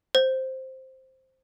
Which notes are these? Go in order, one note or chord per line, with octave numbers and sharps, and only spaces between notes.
C5